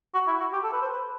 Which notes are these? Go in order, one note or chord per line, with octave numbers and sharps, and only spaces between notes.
F#4
E4
F#4
G4
A4
B4
C5
B4